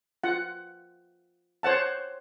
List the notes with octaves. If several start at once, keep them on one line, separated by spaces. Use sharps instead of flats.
F4 F#5
C5 C#5 F#5 A5